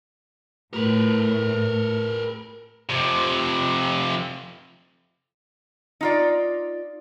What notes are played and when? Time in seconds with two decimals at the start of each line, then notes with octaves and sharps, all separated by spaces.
0.73 A2 A#4 B4
2.90 F2 C3
6.01 D#4 F4 D5